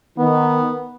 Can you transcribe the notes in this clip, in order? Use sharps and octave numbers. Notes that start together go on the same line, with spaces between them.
D#3 B3